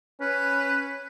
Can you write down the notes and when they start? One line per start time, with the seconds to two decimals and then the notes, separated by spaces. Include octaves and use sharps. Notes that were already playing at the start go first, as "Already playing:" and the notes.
0.21 C#4 B4